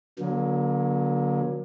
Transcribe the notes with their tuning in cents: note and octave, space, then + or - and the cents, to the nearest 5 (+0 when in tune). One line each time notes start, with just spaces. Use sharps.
D3 -30 F#3 -20 A#3 +35